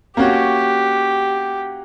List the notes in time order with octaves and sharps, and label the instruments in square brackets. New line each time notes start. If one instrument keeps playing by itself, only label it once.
[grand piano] A#3 C#4 F#4 [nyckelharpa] G4